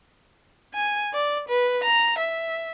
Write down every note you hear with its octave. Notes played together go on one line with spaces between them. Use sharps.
G#5
D5
B4
A#5
E5